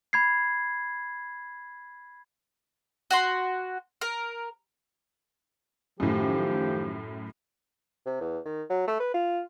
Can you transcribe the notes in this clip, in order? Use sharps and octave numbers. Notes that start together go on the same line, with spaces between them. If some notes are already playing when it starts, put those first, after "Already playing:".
B5 G#6 C7
F#4 F#5 C6
A#4
F#2 A2 D#3 F3 G4
C3
E2
D#3
F#3
A3
B4
F4